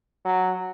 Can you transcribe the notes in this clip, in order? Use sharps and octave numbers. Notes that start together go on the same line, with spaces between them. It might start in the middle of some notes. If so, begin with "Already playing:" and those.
F#3